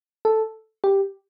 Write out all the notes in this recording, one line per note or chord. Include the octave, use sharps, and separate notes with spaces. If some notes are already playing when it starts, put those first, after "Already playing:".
A4
G4